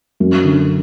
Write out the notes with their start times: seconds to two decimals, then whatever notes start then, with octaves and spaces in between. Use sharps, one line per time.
0.20 F#2
0.44 D3